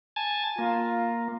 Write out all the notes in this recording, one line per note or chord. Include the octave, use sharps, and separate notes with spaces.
G#5 A5
A#3 F4